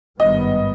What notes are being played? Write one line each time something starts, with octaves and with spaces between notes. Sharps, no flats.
G#1 G2 D#3 G3 B3 D#5